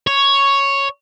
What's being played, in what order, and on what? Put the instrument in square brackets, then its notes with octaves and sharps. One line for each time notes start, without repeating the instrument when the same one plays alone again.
[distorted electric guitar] C#5